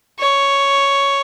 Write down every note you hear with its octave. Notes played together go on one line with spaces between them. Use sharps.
C#5